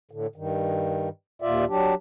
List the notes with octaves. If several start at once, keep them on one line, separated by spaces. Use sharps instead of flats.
A2 D3
G2 D#3
D#2 A#2 F4 D5 E5
F#3 D4 G4